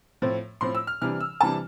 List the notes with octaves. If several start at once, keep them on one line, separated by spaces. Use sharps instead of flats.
A2 F3 C4
A2 F3 C4 C6
E6
F6
C3 E3 G3 D4 F6
E6
C3 E3 G3 D4 A5